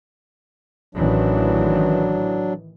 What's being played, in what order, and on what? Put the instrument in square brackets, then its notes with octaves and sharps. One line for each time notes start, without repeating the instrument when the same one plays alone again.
[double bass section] A1 D#3 E3 [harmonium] F#3 D4